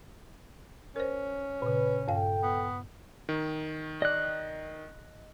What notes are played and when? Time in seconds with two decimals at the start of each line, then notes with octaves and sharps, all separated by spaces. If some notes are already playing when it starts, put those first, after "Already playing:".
0.96 C#4 A#4 C5
1.62 A#2 C#3 B4
2.08 G2 A4 F5 G5
2.43 B3
3.29 D#3
4.02 D5 D#5 F#6